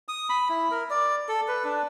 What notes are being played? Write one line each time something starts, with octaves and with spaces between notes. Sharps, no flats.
D#6
B5
E4
A#4
D5
A4
B4
D4